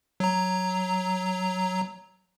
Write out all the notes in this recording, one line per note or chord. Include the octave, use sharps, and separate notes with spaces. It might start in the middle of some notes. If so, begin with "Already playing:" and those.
F#3 A#5